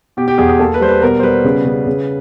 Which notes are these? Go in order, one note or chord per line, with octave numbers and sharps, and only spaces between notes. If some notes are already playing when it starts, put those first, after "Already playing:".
B2 G4
G4
E2 G#4
G#4
A#3 A4
B4
G3 C5
B4
B2 A#4
C5
G3 B4
C#3
C#3
C#3